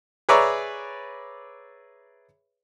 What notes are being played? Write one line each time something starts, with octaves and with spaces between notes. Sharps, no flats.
G#4 B4 C#5 D5 E5 A#5